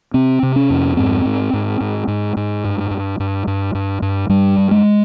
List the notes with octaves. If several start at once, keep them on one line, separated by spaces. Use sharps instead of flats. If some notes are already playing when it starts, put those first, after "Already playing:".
C3 C4
C3
C#4
F2
G#2 C4
G#2
G#2
G#2
G#2
G#2
G2
G2
G2
G2
G2
G2
G2 G3
G2
G#3